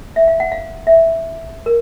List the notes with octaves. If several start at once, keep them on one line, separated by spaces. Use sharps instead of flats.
E5
F5
F#5
F5
E5
A#4